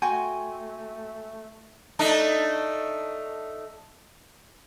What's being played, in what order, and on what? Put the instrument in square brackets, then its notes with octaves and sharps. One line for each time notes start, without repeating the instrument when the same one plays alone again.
[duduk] A3 [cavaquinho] F#4 G5 C6 [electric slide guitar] G#5
[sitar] A3 D4 D#4